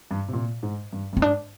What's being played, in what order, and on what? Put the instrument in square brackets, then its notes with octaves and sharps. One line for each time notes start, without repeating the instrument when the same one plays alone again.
[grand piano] G2
C3
A#2
G#2
G2
[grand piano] G2 [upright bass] C4
[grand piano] G#2 [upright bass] D4